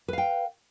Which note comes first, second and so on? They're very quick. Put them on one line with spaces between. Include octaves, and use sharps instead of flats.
B4 F5 G5